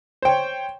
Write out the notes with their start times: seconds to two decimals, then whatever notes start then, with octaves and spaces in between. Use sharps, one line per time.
0.22 C5
0.25 G5
0.28 C#5